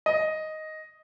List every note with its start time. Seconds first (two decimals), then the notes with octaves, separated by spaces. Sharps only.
0.06 D#5